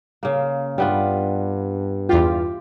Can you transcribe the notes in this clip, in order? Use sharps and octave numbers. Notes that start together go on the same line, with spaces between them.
C#3 A#3
G2 G3 B3 F4
E2 F4 G4